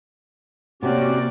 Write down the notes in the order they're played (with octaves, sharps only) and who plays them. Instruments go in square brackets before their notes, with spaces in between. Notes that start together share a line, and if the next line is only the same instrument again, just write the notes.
[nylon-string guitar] C3 [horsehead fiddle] A#3 D5 [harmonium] C#4 F#4 G4